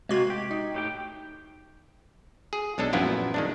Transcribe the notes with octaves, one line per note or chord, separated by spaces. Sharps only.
C3 G#3 A#3 F4 F#4 G#6
G4
D#4
A2 G4 G5
G#4
B1 G#3 D4 A4
F#2 A#2 F3 B3 E4 F4
D#3 G#3 D4